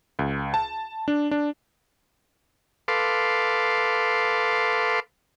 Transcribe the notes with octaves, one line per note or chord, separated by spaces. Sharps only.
C#2
A5
D4
D4
A4 B4 F5 C6 D6